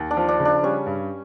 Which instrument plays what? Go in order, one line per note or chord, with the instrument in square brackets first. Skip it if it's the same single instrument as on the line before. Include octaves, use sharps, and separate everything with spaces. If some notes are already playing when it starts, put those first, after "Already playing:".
Already playing: [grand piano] D#2
[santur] D4
[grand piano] F3
[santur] D4
[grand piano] C#3
[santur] D4
[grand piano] G3 [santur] C#4
[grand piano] G2